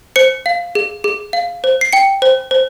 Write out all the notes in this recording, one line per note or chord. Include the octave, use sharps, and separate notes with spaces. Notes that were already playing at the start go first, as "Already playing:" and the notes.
C5 C#7
F5
G#4
G#4
F5
C5
C7
G5 C#7
C5
C5